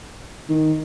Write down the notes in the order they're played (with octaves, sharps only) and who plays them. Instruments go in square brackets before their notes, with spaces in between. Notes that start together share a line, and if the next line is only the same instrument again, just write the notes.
[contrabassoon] D#3